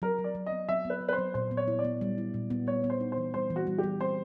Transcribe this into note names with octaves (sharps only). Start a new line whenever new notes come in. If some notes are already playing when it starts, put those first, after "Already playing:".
F#3 A#4
F#3
D5
F#3
B3 D#5
F#3 E5
B3 B4
B3
B4
C5
F#3
A#2 C5
B3
C#5
E4
D5
B3
G3
E4
A#2
B3
G3 C#5
B3
C5
D#4
C5
E3
G3 C5
E3
F#4
G3
G4
G3
C4 C5